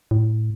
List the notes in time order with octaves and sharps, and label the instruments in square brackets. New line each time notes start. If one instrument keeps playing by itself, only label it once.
[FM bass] A2